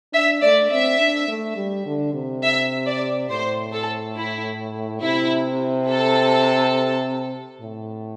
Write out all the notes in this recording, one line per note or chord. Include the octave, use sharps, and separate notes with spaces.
D4 E5
A3 D5
C4 E5
D4
A3
G3
D3
C3
E5
D5
A2 C5
A4
E4
C3 E4
A4
A2